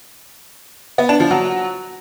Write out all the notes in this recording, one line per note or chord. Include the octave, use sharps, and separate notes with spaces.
B3
D4
F3
F#3